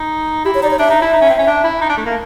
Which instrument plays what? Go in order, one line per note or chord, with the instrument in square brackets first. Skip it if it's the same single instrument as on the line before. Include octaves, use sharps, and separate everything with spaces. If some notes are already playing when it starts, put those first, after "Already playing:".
Already playing: [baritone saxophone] D#4
[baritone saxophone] E4 [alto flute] G4
[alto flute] C#5
[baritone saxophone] D#4 [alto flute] D5
[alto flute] C#5
[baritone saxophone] D4 [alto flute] E5
[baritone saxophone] D#4
E4
D#4
C#4
C4
C#4
D4
E4
D#4
D4
A3
A#3